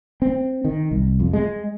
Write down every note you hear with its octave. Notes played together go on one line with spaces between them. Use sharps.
C4
D#3
C2
F2
G#3